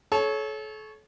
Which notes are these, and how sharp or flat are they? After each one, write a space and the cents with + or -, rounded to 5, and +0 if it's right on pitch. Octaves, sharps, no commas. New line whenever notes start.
A4 -35 C#5 +0